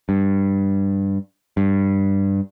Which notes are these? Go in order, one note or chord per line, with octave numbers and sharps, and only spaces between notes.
G2
G2